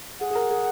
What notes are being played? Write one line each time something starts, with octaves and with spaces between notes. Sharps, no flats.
G#4 F#5
G#4
A#4
G#4